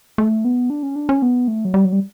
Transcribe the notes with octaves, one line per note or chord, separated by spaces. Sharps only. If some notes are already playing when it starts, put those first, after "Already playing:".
A3
B3
D4
C#4
D4
C#4
B3
A3
F#3
G3
F#3
G3